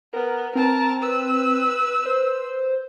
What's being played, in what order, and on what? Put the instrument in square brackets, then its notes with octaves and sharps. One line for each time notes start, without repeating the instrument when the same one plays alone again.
[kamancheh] B3 [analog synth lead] A#4
[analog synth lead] C4 [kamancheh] A#4 A5
[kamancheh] B4 E6
[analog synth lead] C5